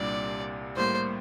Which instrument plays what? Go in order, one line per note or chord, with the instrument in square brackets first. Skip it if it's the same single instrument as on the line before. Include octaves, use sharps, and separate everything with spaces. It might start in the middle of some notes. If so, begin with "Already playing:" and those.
Already playing: [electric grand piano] C2 A#2 G3 D4 [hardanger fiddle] D5
[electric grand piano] A2 G3 A#3 [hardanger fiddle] C5